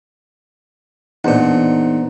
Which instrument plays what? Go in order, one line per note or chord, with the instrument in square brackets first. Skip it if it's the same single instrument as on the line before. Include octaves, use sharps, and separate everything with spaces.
[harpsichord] E2 A#2 [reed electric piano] D4 C5 F#5 [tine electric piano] D#4